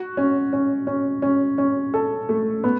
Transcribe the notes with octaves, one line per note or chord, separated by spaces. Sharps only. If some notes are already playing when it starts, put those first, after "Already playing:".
Already playing: F#4
C#4
C#4
C#4
C#4
C#4
A4
A3
B3